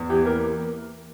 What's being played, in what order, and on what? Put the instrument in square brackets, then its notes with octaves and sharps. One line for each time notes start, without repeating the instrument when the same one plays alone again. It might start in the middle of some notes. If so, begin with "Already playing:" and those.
Already playing: [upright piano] E2
[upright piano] E3 [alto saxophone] G4
[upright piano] A#3 [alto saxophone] A#4